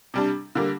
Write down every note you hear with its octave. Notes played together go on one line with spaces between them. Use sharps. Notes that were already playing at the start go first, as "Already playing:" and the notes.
C3 G3 D4
D3 G3 A#3